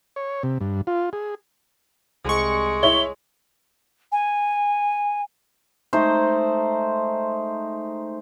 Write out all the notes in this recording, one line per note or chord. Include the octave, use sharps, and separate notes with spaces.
C#5
C3
G2
F4
G#4
C2 G#3 C#6
E4 C#5 G7
G#5
G#3 A3 D#4 C5